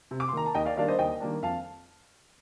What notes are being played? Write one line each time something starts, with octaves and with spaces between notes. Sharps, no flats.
C3
D6
C6
D#3 A#3 A#5
A5
D#2 D#5 G5
D5 F5
D#3 G3 A#3 D4 D5 F5
C5 D#5
D#2 D#5 G5
D#3 G3 A#3 D4
F2 F5 A5